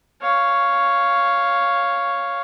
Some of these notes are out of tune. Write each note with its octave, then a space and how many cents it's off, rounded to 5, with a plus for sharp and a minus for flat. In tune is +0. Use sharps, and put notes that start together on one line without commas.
C#5 +0 F5 +0